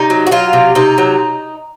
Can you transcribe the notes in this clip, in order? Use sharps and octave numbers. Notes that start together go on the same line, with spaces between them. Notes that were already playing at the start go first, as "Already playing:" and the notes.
Already playing: C3 D#4
F#3
F#4
F#3 F4
C3
C3 D#4
F#3